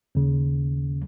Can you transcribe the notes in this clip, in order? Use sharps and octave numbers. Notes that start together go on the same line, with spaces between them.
D#2 C#3